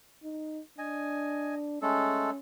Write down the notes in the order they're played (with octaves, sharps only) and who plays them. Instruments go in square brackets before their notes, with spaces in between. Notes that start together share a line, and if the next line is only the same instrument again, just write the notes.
[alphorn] D#4
[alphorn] D4 [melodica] D#5 G#5
[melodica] G#3 A3 A4 [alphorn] C#4